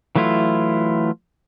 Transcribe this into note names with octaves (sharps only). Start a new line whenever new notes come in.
E3 F#3 A3 E4 F4